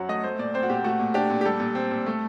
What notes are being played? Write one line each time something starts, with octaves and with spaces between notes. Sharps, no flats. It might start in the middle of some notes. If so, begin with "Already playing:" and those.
Already playing: F#2 F#3 F#5
A3 D#5
A3 C5
A#2 D5
C4 C5
F#4
A#2 G4
A3 F#4
A#2
D4 G4
A#2
G4
G3 A4
A#2
C4
A#2
A3